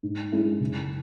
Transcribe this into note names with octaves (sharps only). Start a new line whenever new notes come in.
G#2
G#3 C#4 E4
F#1